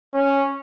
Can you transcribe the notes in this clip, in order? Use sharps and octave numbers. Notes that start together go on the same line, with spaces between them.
C#4